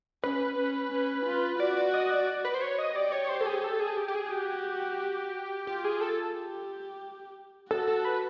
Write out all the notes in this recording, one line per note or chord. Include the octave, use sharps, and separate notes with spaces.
C#4 B4
C#4
C#4
F4
F#4 D5
D5
D#5
D5
B4
C5
C#5
D#5
G4 D5
C#5
C5
A4
G#4
A4
G#4
G4
G4
G#4
F#4 G4
F4 G4
G#4
A4
G4
F#4 A4
A4
B4